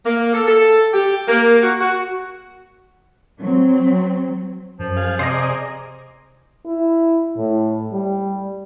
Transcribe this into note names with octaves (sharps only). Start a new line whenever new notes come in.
A#3
A4
A4
G4
A#3
F#4
F#4
F#3 C4
F#2 F3
G#4 F5
C3 G#4 C5 D5 D#5 A#5
E4
A2
G3